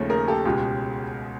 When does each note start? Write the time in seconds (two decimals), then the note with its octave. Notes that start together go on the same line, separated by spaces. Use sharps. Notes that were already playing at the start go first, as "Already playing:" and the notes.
Already playing: D#2 C#3 F3 A3 C#4
0.10 G#4 A#4
0.28 G4 A4
0.45 C#2 B2 G#3 F4 G4